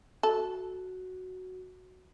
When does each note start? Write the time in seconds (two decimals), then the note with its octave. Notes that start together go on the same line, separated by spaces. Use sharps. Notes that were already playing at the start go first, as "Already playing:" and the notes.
0.23 F#4 A4